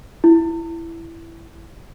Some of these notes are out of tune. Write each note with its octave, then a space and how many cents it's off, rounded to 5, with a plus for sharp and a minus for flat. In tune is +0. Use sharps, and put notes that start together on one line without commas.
E4 +10